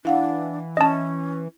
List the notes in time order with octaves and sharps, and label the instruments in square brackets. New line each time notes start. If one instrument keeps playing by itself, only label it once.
[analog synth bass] E3 [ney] D4 [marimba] E4 F5 F#5
[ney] C#4 [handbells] D#5 A5